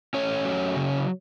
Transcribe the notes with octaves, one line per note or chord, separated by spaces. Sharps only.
A3 C#4 C#5
F#3
C#3